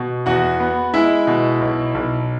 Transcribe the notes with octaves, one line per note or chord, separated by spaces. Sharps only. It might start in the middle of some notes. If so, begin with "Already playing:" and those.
Already playing: B2
E2 F#4 F#5
B3
G#3 E4 E5
B2
B1
B1